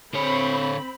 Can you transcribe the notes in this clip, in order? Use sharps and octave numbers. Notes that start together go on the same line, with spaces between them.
D3 C4 C#5 B5